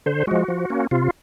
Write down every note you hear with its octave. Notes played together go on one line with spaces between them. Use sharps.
D3 C5
F3 G#3 F#4
F3
A#3 C#4
C3 F4